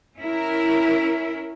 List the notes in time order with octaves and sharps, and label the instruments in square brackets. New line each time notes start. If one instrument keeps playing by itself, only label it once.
[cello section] C#4 E4 A#4